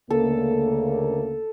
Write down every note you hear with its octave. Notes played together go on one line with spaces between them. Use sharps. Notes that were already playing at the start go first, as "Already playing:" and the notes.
D2 C#3 A#3 A4